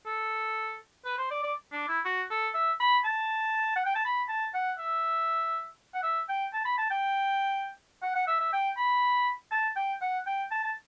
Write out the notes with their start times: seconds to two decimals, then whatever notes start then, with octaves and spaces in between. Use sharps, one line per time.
0.06 A4
1.05 B4
1.18 C5
1.31 D5
1.44 D5
1.72 D4
1.88 E4
2.05 F#4
2.31 A4
2.55 E5
2.80 B5
3.05 A5
3.76 F#5
3.86 G5
3.95 A5
4.05 B5
4.29 A5
4.54 F#5
4.79 E5
5.95 F#5
6.03 E5
6.29 G5
6.53 A5
6.65 B5
6.78 A5
6.91 G5
8.03 F#5
8.15 F#5
8.28 E5
8.40 E5
8.53 G5
8.77 B5
9.51 A5
9.76 G5
10.02 F#5
10.26 G5
10.51 A5
10.64 A5